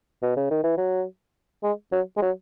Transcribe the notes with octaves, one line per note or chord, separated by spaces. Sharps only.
B2
C#3
D#3
E3
F#3
G#3
F#3
G#3
F#3